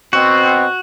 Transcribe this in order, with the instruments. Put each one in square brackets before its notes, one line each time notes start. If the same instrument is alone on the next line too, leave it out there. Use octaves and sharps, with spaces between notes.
[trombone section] B2 C4 [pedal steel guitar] F#4